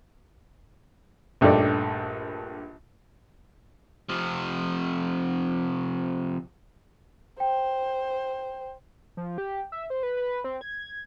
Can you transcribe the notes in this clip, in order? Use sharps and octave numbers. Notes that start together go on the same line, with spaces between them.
A#1 G2 A3 D#4 G4 D5
C3 F3
C5 G5
F3
G4
E5
C5
B4
B4
C4
G#6